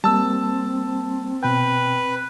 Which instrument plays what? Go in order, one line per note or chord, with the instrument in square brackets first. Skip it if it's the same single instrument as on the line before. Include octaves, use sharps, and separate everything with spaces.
[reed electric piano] G3 A#3 [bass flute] C4 [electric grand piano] A5 E6
[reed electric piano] B2 G5 [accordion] B4